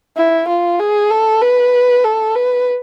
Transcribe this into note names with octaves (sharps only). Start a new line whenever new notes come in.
E4
F4
G#4
A4
B4
A4
B4